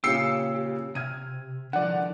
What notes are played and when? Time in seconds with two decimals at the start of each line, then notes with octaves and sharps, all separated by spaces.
0.04 A#2 C#3 G4 E6 C7 C#7
0.95 C3 F6 G#6 D#7
1.73 D3 D#3 F3 D5 F#5